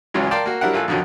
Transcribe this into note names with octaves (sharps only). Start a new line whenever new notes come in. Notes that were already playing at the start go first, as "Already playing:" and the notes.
G#1 C#2 C#3 E3 F#3 G#3
A#4 D5 F5 G5 A5 C6
A#3 F#4
F#3 G3 D4 E4 A#4 F#5
A1 F4 A4 G#5 F#6
F2 B2 D3 D#3 F#3